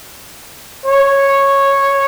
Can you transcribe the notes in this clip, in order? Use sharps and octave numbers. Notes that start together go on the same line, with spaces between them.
C#5